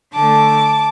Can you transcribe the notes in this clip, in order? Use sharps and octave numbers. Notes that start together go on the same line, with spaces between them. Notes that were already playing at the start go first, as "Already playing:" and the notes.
D3 A3 A5 D6